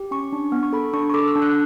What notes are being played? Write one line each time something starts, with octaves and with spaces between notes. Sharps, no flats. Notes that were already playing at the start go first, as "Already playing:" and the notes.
Already playing: G4
C#4 C#6
D4
B3
C#6
A4 B5
D4 C#6
C#6
A4 D6
E6
D4
F#6